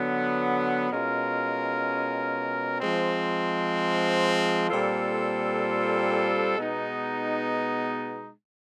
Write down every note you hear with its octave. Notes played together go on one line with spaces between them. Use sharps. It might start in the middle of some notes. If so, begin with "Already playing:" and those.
Already playing: D3 F#3 B3
B2 G#3 C#4 F4 A#4
F3 G#3 C4
A#2 G3 C4 F4 A4
B2 G#3 B3 D#4